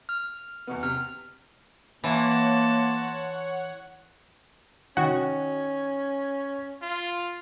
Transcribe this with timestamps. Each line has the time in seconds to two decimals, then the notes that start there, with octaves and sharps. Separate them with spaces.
0.09 F6
0.67 E2 B2 B3
0.83 C3 F6
2.04 E3 A#3 C#5 F#5 A5 C6
4.97 D#3 C#4 F#4
6.82 F4